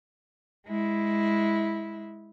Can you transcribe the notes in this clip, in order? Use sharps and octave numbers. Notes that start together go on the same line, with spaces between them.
G#3 E4